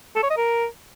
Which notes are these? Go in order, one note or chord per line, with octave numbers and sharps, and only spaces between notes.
A4
C#5
D#5
A#4